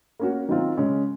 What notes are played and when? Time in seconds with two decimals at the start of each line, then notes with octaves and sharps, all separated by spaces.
0.20 A#3 C#4 F#4
0.49 D#3 F#3 C4 F4
0.77 C#3 G#3 C#4